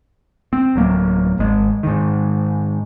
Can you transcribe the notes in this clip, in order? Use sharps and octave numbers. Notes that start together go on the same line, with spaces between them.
C4
D1 F#3 A#3
G#1 G#3
G#2 D#3